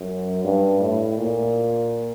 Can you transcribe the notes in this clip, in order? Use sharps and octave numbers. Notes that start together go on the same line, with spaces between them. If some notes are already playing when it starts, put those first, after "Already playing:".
Already playing: F#2
G2
A2
A#2